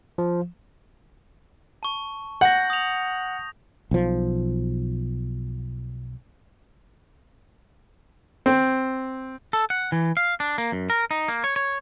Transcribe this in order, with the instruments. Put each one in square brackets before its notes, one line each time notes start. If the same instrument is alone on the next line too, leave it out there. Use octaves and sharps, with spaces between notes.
[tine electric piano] F3
[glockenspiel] A5 C#6
[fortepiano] F#5 [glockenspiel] G6 A#6
[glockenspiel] D#6 F7
[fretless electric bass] B1 F3
[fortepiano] C4
[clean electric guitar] A4
F#5
E3
F5
D4
A#3
F#2
A#4
D#4
A#3
C#5
C#5